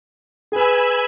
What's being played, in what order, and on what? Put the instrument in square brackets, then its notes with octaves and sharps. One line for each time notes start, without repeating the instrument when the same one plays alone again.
[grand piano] G#4 B4 [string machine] G#5 B5 E6